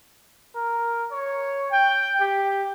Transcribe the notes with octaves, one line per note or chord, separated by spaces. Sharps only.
A#4
C#5
G5
G4